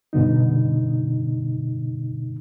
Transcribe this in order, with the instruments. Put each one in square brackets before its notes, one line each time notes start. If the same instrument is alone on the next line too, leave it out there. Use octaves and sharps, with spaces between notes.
[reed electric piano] G2 B2 D3 D#4